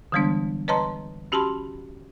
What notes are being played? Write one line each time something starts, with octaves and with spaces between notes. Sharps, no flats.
D3 E3 G3 G#3 B3 D4
B4 C#5 D#5 A5 A#5 C6
C#4 F#4 G4 A5 B5 C6